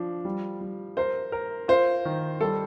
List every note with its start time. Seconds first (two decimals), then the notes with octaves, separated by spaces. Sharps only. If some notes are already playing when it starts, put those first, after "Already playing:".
Already playing: F3 D4
0.25 G3
0.61 G3
0.97 A#4 C5
1.32 A#4
1.68 F4 C5
2.05 D#3
2.41 G3 A4